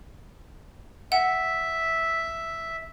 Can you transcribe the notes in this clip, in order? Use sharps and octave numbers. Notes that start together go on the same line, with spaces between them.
E5 F#5